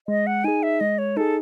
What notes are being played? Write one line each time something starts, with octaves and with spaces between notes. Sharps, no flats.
G#3 D#5
F#5
D#4 G#4 G#5
E5
G#3 D#5
C#5
D#4 G#4 A4